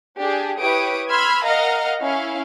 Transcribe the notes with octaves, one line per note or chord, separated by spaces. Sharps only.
D4 G4 G#4
E4 G4 B4 C#5 D#6 D7
B5 C6 E6 F6 G#6
A#4 D#5 F5 F#5 A#5 F6
C#4 E4 F5